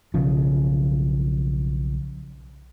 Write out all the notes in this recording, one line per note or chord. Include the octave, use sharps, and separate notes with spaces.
B1 C#3 F3